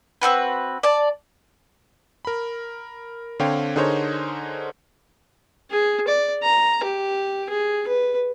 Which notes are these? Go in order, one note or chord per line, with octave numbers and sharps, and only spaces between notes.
C4 D#4 F#4 B4
D5 A5
A#4 B5
D3 C4 C#5 F5 G5
D3 D#4 G#4 A#4 C5 C#5
G#4
D5
A#5
G4
G#4
B4